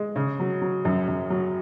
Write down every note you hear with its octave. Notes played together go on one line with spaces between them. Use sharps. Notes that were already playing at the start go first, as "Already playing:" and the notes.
Already playing: G#3
C#3
F#3
F#3
F#2
F#2
F#3